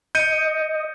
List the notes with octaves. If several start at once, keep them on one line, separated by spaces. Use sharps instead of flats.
D#5 G6 C#7 D#7